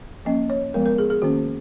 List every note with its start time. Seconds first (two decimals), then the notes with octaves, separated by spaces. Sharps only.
0.25 F3 A#3 C#4 D#5
0.50 C#5
0.74 F3 G#3 B3 A#4
0.86 A#4
0.98 G#4
1.10 G#4
1.22 D#3 A#3 C#4 F#4